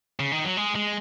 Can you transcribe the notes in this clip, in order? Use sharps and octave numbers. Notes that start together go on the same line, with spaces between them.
C#3
D#3
F#3
G#3
G#3